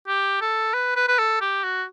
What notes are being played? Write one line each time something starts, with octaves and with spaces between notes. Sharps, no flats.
G4
A4
B4
B4
B4
A4
G4
F#4